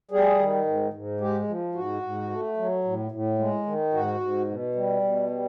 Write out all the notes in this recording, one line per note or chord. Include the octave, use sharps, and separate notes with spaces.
G3 G#4
D#3
G#2
G#2
G#3 G4
F3
G#2 F#4
G#2
A3
F#3
A2
A2
G#3
D#3
G#2 F#4
G#2
B2
G3
B2
G3